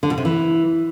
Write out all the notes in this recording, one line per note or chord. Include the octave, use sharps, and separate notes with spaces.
D3
B2
C3
E3